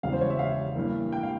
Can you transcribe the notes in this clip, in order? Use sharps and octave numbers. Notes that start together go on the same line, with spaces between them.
E1 E2 C#3 G3 F5
C5
C#5
E5
F5
G2 E3 A#3
G5
F5